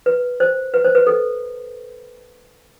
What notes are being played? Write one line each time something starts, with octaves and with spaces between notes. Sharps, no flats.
B4
C5
B4
C5
B4
A4